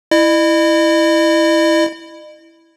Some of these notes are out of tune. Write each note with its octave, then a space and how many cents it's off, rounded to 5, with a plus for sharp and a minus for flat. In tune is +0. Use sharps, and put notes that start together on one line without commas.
E4 +0 D#5 -40